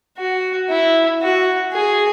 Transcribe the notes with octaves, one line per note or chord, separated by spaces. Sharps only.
F#4
E4
F#4
G#4